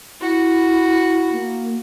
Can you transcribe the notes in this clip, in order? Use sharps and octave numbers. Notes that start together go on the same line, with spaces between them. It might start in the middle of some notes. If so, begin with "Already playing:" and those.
E4 F#4
A#3